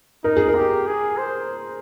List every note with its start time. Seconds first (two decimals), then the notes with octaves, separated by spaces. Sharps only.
0.24 D#4 A#4
0.37 G#4
0.48 A#4
0.55 G4
0.86 G#4
1.18 C5